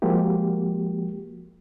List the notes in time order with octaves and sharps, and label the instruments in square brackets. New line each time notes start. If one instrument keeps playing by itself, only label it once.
[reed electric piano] F3 G#3 A#3 F#4 G4